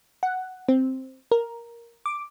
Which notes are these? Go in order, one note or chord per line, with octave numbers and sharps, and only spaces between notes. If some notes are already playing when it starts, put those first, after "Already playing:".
F#5
C4
A#4
D6